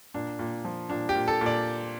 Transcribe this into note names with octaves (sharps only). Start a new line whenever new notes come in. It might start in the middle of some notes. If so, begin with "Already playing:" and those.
A#2 D4
A#2
F3
A#2 D4
G4
A#2
A4
A#2
D5